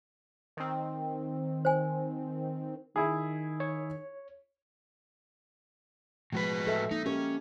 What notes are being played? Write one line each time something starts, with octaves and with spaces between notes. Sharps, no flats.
D#3 C4
C5 G#5
D#3 E4 G#4
C#5
A2 F3 G#3 F#4 B4
A4 E5
A#3 D#4
C#4 G4 A#4